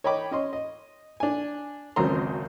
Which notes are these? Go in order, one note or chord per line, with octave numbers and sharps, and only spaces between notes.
C#5 D#5 G5 B5 D6
C#4 D#5 C6
D#5
D4 G#5
G#1 C#2 F#2 C4 A#5 C6